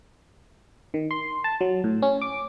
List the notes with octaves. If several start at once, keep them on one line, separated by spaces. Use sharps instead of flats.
D#3
C6
A5
F#3
A2
C#4
D6